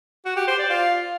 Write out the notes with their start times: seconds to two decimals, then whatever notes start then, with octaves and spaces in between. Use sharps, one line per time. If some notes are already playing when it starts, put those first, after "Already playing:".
0.25 F#4
0.36 G4
0.48 C5
0.59 D5
0.70 F4